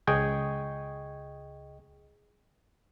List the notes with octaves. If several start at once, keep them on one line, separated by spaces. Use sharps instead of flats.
C#2 G#4 D#5 G5 C#6 G#6